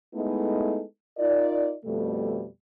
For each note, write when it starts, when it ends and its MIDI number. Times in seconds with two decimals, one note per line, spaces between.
0.15 0.83 56
0.15 0.83 57
0.15 0.83 59
0.15 0.83 63
0.15 0.83 64
0.15 0.83 69
1.18 1.73 63
1.18 1.73 65
1.18 1.73 70
1.18 1.73 74
1.84 2.46 41
1.84 2.46 47
1.84 2.46 55
1.84 2.46 57